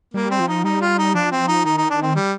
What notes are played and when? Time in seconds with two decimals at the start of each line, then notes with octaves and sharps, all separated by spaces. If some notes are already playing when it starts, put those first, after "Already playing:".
0.14 G3 A#3
0.31 C4
0.40 F3
0.48 D#4
0.64 G3 D#4
0.81 F4
0.98 D#4
1.15 F3 D4
1.32 C4
1.48 D#4
1.65 D#3 D#4
1.77 D#4
1.90 D4
2.02 C4
2.15 G3